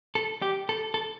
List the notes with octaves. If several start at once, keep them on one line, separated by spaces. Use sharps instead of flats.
A4
G4
A4
A4